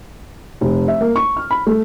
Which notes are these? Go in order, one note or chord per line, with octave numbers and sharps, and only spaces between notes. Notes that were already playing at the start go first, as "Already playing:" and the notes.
F1
E5
A#3
C#6
F6
B5
A3